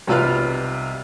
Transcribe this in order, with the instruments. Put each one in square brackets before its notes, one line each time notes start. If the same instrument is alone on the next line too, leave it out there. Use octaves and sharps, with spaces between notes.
[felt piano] B1 C3 G3 F4 B4 F6